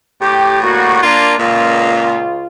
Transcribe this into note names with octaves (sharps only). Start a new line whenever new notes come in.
A2 G4
G3 A#3 F#4
A#3 D4 F4
C#2 A#2 F4